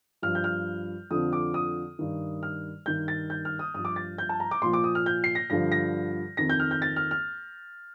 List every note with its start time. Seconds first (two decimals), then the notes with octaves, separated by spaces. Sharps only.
0.22 G2 F3 F6
0.35 G6
0.44 F6
1.11 F2 D3 F3 D#6
1.33 D6
1.54 D#6
1.99 G2 D#3
2.43 F6
2.86 G2 D#3 G6
3.08 A6
3.30 G6
3.45 F6
3.59 D#6
3.74 G2 F3 D#6
3.85 D6
3.96 A6
4.18 G6
4.29 A5
4.40 A#5
4.51 D6
4.62 A#2 F3 C6
4.73 D6
4.84 D#6
4.95 F6
5.06 G6
5.24 C7
5.35 A#6
5.50 G2 D3 F3 A#6
5.72 A#6
6.37 F2 D#3 A#6
6.49 G6
6.60 F6
6.71 G6
6.82 A6
6.96 F6
7.11 F6